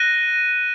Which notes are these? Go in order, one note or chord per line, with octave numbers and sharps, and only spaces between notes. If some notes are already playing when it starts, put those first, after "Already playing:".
Already playing: F#6 A#6 D#7 G7